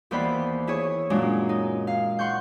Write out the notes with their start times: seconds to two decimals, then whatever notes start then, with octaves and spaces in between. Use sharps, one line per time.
0.11 D#2 E3 B3 C5 D5 B5
0.67 E4 G#4 C#5
1.10 F#2 A#2 G#3 C#4 D4
1.49 D#4
1.87 F5
2.19 F#5 C6 C#6 G6